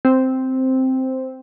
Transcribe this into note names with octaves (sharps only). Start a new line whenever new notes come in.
C4